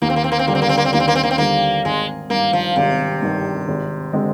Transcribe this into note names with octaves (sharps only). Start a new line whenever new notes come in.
D#2 A#3
C4
A#3
C4
A#3
C4
D3 G3 A#3 D4
C4
A#3
C4
A#3
C4
D#2 A#3
C4
A#3
C4
A#3
C4
D3 G3 A#3 D4
G#1 G#3
G2 D#3 A#3
F3
G#1 C3
G2 D#3
G#1
D3 G#3 C4